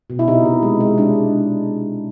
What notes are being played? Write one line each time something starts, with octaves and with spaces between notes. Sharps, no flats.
B2
E4
C3 D#4
C3
G#3
G#3
G#3 D4